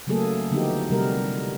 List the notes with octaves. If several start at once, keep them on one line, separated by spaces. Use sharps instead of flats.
C#3 F#3 A3 A#3 G#4 A4
D3 F3 B3 D#4 F#4 G4
C3 G3 A#4